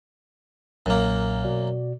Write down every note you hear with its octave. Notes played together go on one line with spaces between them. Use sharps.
B1 F#2 A#2 A#3 F6
B2 F#4 D5